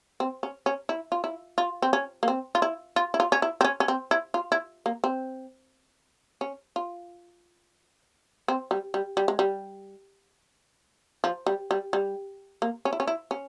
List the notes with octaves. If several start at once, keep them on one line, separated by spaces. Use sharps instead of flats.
C4
C#4
C#4
E4
F4
E4
F4
C4
C#4
A#3
C4
F4
E4
F4
E4
F4
C#4
E4
C4
C#4
C#4
C4
E4
F4
E4
A#3
C4
C#4
F4
C4
G3
G3
G3
G#3
G3
F3
G3
G3
G3
A#3
C#4
E4
C#4
E4
C#4